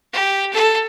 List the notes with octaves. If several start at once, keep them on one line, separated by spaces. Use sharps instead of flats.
G4
A4